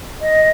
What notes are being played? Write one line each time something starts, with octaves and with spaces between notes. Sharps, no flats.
D#5